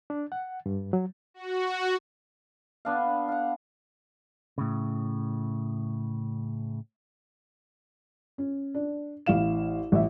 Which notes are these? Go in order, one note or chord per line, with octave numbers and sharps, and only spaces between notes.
D4
F#5
G2
F#3
F#4
B3 D4 F5
F5 F#5
A2 C#3
C#4
D4
A1 E4 F5 E7
A1 E5